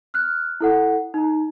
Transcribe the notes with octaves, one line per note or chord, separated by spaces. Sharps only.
F6 F#6
E4 A4 F#5
D#4 A#5